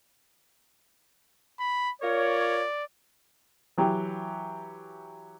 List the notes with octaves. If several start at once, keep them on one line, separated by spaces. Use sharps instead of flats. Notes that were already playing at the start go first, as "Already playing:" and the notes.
B5
F4 A#4 C#5 D5
E3 F#3 G4